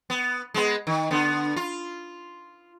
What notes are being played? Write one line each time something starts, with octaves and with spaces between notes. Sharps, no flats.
B3
G#3 B3
D#3
D3 B3
F4